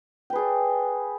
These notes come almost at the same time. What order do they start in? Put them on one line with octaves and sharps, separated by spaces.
G5 B4 G#4 D5